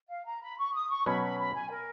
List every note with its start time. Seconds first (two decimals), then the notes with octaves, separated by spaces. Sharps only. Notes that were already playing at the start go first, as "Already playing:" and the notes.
0.09 F5
0.25 A#5
0.42 B5
0.58 C#6
0.74 D#6
0.90 C#6
1.06 B2 F#3 C#4 B5
1.22 B5
1.39 B5
1.55 G#5
1.71 A#4